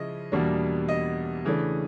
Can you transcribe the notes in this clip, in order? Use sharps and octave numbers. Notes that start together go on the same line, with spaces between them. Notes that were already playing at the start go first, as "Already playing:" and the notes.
Already playing: C#3 F3 G#3 C#4 E4 D#5
E2 B2 G3 A#3 D4
D#5
C#3 E3 A3 D4